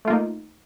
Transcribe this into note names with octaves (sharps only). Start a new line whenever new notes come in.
A3 A#3 D#4 F4